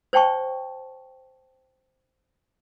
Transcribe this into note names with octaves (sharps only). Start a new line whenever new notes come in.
C5 C#5 G5 A5 C#6